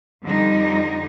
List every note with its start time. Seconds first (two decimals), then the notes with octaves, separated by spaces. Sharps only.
0.23 F2 D3 G3 D#4